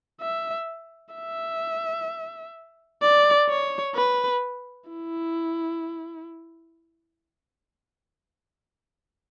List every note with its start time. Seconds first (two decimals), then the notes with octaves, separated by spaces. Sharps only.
0.21 E5
1.15 E5
3.02 D5
3.49 C#5
3.95 B4
4.90 E4